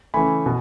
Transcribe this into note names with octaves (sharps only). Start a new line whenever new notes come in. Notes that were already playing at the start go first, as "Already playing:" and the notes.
C#3 E3 A3 G#5 B5
B2